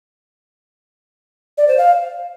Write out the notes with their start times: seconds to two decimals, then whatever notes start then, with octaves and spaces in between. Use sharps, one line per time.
1.58 D5
1.68 C5
1.78 F5